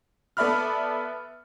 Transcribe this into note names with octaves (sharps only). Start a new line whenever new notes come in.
B3 A4 D5 E5 B5 F6